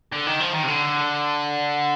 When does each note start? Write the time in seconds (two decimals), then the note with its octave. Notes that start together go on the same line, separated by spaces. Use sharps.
0.12 D3
0.27 D#3
0.40 F3
0.53 D#3
0.63 C3
0.68 D3